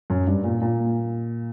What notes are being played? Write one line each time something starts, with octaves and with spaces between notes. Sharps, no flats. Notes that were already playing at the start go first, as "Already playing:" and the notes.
F#2
G2
A#2
A#2